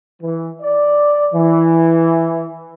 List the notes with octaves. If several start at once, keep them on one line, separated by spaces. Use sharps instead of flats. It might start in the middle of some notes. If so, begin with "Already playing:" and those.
E3
D5
E3